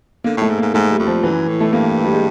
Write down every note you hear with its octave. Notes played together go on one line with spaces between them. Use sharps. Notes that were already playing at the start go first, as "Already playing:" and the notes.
D3 A#3
A2 A3
G#2
A#3
G#2
G#2 A3
G3
F2
F3
F#2 E3
A2
A3
G2 A#3
G3
G#3